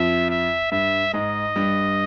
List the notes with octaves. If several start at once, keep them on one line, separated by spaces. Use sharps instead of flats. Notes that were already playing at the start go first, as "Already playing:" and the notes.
Already playing: F2 F3 E5
E5
G2 G3 E5
G#2 G#3 D#5
G2 G3